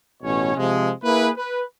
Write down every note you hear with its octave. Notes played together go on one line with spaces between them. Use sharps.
A1 B2 C#4 C#5
C3 F3 G#3
A#3 E4 G#4 B4
B4